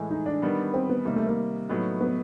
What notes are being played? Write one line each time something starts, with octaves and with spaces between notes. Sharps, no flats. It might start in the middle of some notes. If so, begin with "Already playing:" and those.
Already playing: A2 E3 G#3
D#4
D4
D#3 G3 B3
C4
B3
C3 D#3 G3 A#3
A3
A#3
A2 F#3 B3 D#4
B3